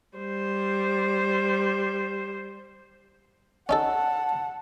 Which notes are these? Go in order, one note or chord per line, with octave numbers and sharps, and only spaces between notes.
G3 C5
C#4 D#4 A4 F#5 A5